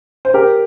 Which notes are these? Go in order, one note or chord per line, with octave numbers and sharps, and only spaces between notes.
C5
G4 A#4